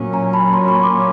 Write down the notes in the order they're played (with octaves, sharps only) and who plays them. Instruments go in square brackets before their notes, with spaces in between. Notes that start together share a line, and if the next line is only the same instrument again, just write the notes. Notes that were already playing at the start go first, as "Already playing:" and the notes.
Already playing: [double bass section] A#2 F#3 A#3 C#4
[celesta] G#5 A#5
A5 B5
A#5 C6
B5 C#6
C6 D6